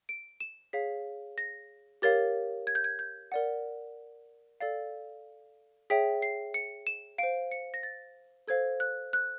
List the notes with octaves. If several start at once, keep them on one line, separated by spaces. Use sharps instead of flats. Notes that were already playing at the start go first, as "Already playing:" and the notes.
D7
E7
G#4 C#5 F5 B6
A#6
G4 A#4 C#5 F5 A6
G#6
G6
G#6
G6
A#4 D5 F#5
A4 D5 F5 A6
G#4 C#5 E5 G5 B6
C7
C#7
E7
C5 F5 D7
C#7
A#6
A6
A4 C5 F5 G#6
F#6
F#6